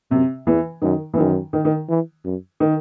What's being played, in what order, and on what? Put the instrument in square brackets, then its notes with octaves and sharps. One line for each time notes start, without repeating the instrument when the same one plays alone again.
[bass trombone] F#2 [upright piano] C3
[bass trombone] E2 [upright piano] E3
[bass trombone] F#2 [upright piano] D#3
[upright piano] E3
[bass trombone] F#2 [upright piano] D#3
[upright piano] D#3
D#3
[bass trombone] E3
F#2
[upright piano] D#3